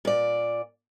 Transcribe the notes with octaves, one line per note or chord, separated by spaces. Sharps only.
A#2 D5